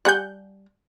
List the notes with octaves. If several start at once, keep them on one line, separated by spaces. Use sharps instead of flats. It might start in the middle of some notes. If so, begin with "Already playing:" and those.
G3 F#5 G#5 F#6 G6